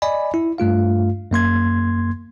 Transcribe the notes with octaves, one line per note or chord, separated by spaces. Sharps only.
D5 D#5 G#5 B5
E4
G2 A3 F4 F5
F#2 A#3 C6 G#6